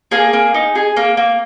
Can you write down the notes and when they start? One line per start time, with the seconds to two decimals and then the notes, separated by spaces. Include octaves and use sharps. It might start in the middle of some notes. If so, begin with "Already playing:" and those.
0.11 A#3 G#4 G#5
0.33 A#3
0.54 D#4
0.75 G#4
0.97 A#3
1.17 A#3